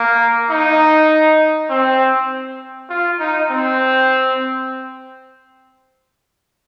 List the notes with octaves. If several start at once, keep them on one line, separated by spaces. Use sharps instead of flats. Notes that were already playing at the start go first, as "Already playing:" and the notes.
Already playing: A#3
D#4
C4
F4
D#4
C4